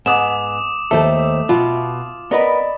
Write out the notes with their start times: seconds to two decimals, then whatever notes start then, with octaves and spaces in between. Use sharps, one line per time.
0.06 G#2 B3 D6 D#6 E7
0.91 D#2 A3 A4 C5 E5 A5
1.49 B2 F4
2.31 B3 A#4 B4 D5 D#5 B5